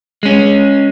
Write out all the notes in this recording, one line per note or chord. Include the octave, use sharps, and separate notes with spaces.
G#3 C#4